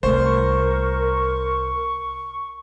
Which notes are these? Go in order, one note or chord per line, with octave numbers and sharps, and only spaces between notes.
C2 A3 A#4 C5 C#6